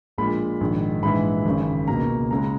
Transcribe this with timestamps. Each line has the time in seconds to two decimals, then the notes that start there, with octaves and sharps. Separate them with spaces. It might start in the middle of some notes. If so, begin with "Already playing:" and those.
0.18 A#1 A#2 G#3 B5
0.61 A#1 G#2 D#3
1.03 A#1 G#2 E3 G#3 B5
1.46 G#1 F#2 C#3
1.88 C#2 B2 A#3 A#5
2.31 C#2 C#3 G#3 A#5